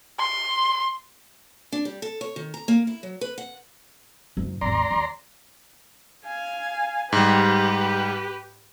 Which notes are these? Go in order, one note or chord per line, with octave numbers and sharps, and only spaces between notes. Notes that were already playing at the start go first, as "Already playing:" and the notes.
C6
D4
G3
A4
C#5
D#3
A#5
A#3
E4
F#3
B4
F#5
F#1 D#4
G#1 D#2 D5 A#5 C6
D#2
F5 G#5
G#2 G3 G4 B4